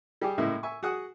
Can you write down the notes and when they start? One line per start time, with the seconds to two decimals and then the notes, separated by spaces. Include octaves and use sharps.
0.22 G3 G4 G#4 D6
0.38 A2 C#3 G#3 A#3 E4 E5
0.63 E5 G#5 C#6
0.83 F#4 G#4 F#5 D#6